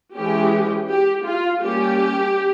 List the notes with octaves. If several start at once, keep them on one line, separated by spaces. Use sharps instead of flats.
E3 G#3 C#4 G4
G4
F4
G3 A#3 C#4 G4